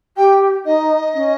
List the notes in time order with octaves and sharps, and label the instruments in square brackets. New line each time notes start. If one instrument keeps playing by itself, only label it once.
[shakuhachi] G4 [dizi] G5
[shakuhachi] D#4 [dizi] D#5
[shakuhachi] C#4